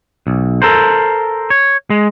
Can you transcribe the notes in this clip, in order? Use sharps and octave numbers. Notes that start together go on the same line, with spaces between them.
B1
A4 A#4 C5
C#5
G#3